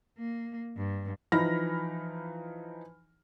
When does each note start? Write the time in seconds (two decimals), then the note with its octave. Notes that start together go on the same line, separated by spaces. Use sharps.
0.18 A#3
0.77 G2
1.32 E3 F3 D#4 B5 F6 A#6